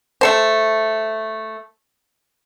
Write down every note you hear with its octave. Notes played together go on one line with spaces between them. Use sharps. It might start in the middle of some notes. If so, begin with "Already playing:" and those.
A3 A4 C5